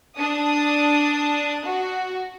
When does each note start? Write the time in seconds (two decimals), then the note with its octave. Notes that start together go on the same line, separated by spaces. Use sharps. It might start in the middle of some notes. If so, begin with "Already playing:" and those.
0.19 D4 D#6
1.67 F#4